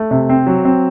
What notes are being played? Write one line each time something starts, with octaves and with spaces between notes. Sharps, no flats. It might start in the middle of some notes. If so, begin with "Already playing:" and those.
Already playing: A3
C3
C4
F#3
C4